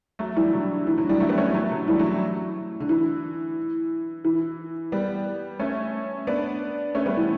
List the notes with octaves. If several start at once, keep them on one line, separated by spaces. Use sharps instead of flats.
F#3 A3
E3 G3
D3 F#3
E3
D3 F#3
E3 G3
F#3 A3
G3 B3
A3 C#4
F#3 A3
D3 F#3
E3 G3
F#3 A3
D3
E3
E3
G3 B3
A3 C#4
B3 D4
A3 C#4
G3 B3
E3 G3